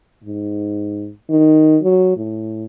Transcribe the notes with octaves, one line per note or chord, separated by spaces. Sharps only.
G#2
D#3
F#3
A2